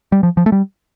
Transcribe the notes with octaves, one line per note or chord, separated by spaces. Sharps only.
G3
F3
F3
A3
G3